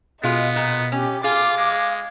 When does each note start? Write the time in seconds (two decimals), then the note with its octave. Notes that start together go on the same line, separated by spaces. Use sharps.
0.23 B2 G#3 B3 F4 D#5
0.56 A#2
0.92 C#4 G4
1.24 F4 G#4 F5 D6
1.57 G#3